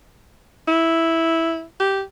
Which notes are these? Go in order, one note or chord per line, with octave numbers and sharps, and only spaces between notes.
E4
G4